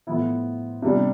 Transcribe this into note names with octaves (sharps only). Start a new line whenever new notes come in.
A2 F3 B3 E4
C3 G3 D4